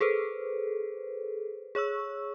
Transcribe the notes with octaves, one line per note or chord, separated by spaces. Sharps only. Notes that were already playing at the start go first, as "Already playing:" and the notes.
G#4 A4 B4 C5
G#4 C#5 C#6 E6